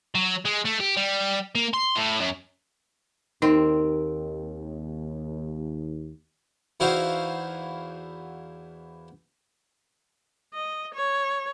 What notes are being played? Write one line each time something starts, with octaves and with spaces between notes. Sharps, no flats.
F#3
G#3
A3
G4
G3
A#3
C6
A2
F#2
D#2 D#3 C4 D#4
E2 D#4 E4 F#4 C5 F5
D#5
C#5